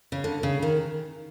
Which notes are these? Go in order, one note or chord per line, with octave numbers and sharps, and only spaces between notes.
C#3
D3
C#3
D#3